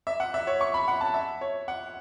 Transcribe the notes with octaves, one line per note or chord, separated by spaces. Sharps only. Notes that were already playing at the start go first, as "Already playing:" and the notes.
E5
F#5
E5
C#5
C#6
B5
F#5
A5
E5
C#5
F#5